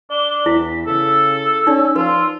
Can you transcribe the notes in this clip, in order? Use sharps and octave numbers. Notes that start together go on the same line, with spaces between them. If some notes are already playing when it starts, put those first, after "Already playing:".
D4 D5 G7
E2 E4 B6
C#3 A4 E6
C#4 D#4 D5
F3 F4 B4